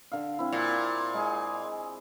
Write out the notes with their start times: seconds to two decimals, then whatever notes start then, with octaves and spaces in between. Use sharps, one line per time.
0.12 D3 F5
0.39 C4 E4
0.53 A#2
1.14 G#3 G#4